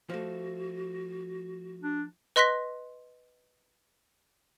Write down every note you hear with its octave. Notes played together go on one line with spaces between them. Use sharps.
F3 A3 F#4
D4
B4 D#5 C6 F#6 A#6 B6